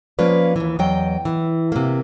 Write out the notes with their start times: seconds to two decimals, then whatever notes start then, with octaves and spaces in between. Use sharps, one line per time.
0.19 F3 A#3 C#4 F4 B4 D5
0.56 D#2 E3
0.79 E2 F#3 D#5 G5
1.25 E3
1.72 C3 A#3